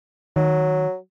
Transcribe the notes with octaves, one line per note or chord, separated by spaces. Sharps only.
D#3 F#3